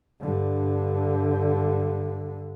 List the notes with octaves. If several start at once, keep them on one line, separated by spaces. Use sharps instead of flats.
G2 D3